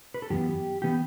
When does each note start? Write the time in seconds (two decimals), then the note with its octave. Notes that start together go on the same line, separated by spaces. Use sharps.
0.14 B4
0.22 A4
0.30 F#2 E3 B3 G4
0.82 E3 B3 G4